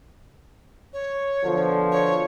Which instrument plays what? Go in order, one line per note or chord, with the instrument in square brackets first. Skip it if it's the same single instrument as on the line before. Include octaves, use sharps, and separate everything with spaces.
[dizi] C#5
[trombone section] B2 D3 F3
[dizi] C#5